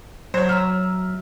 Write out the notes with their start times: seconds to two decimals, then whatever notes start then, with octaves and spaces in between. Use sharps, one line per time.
0.34 F#3 C5 C#5
0.49 E5 A#5 E6 F6